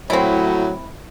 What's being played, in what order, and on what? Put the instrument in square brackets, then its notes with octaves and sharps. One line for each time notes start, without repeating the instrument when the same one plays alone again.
[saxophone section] A2 F#3 [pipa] C4 E4